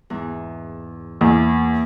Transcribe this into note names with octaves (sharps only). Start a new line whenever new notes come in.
E2 G#2
E2 A#3